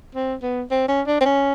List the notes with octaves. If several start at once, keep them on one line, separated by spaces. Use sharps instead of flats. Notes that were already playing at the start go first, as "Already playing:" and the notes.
C4
B3
C4
C#4
D4
C4
C#4